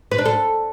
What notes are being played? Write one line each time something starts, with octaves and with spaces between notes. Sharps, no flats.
B4
D4
A4